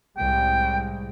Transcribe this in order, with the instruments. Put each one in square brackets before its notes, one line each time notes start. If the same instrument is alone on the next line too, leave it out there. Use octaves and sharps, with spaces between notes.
[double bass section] C2 A2 G#3 [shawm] G5